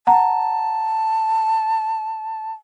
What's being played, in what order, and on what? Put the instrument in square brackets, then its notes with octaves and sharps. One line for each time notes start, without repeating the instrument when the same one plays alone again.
[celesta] F#5 A#5 [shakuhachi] A5